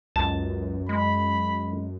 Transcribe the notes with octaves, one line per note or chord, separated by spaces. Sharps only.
C#2 F#2 A5
G#3 B5